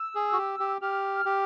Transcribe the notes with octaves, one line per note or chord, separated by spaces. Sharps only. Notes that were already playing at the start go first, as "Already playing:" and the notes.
Already playing: E6
G#4
F#4
G4
G4
G4 F6
G4